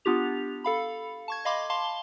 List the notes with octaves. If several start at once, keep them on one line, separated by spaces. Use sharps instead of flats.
B3 D4 F4 G4 F7
A4 F5 B5
A5 C#6 G#6
D#5 F5 B5 C6 D6
F5 A5 C6 G7